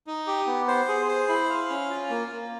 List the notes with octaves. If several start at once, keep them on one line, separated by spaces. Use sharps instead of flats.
D#4
G4
B3
C5
G#4
C5
E4
F5
C#4
F4
A#3
A#3